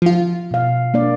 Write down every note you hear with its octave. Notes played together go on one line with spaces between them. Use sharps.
F3 F4
B2 F5
A#3 D4 D5